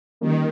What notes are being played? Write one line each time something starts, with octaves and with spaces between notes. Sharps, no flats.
D#3 G3 A#3 C#4